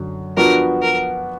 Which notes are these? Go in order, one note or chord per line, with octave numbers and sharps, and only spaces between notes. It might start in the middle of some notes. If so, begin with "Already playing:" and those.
Already playing: F#2 D3 F#3
F3 B3 D4 F#4 A#4
A#4